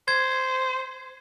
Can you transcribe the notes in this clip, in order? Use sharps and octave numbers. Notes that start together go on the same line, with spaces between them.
C5 G#6